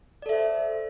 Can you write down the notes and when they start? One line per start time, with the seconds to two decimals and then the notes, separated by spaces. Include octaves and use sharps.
0.22 D5
0.26 A4
0.29 E5
0.33 C5